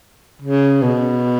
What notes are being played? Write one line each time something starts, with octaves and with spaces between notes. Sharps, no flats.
C#3
B2